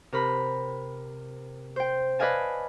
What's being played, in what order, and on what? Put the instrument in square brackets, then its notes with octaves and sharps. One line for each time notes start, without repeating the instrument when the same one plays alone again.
[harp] C3 A#4 B5
C5 G5
B4 D5 D#5 F5 G#5 A5